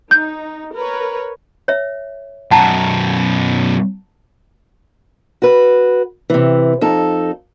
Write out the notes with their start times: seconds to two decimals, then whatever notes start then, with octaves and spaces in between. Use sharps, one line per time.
0.11 D#4 G6
0.75 A#4 B4 C#5
1.68 C#5 E5
2.51 F#2 B2 F#5 A5 A#5
5.42 F#4 B4
6.30 C3 E3
6.81 F2 D#4 A4